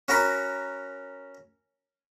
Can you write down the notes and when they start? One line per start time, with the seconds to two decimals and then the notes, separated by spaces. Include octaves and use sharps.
0.08 C#4 F#4 A#4 B5